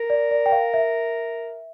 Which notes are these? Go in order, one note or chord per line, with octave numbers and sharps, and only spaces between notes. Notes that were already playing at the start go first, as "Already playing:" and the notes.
Already playing: A#4
D5
D5
G5
F5
E5